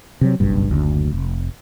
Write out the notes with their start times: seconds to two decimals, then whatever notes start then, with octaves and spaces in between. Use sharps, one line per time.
0.21 C3 F#3
0.40 F#1 B1 G2
0.68 F#1 D2
1.12 F1